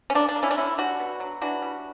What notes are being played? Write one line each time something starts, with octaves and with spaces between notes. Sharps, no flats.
C#4
A#3 D4
D4
A#3
C#4 E4
D4
D3 C#4 E4
G3 D4 F#4
B2
F#3
E3 D4 F#4
G3